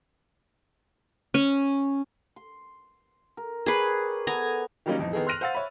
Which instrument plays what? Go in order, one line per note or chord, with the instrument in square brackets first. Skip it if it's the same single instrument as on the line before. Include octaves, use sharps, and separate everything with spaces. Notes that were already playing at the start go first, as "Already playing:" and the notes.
[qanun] C#4
[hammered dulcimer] C6
A#4
[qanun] G#4 B4 [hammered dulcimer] C#5 D5 G5
[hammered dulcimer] B3 A4 [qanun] G#5 A#5
[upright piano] D#3 F#3 G3 A#3 C#4 D#4
A1 F2 D#4
D#3 B3 D#4 G#4 A4
C6 F6 F#6 A#6 D#7 F7
C5 F5 F#5 E6 A6
C#5 E5 B5